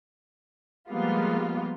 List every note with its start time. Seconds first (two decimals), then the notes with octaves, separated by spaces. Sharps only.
0.90 F3 G3 G#3 A#3 B3 F4